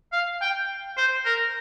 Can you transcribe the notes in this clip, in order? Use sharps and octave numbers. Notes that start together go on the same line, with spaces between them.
F5
G5
C5
A#4